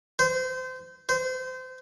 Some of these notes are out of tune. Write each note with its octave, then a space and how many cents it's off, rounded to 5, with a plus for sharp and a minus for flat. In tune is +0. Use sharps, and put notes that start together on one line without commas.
C5 -30
C5 -30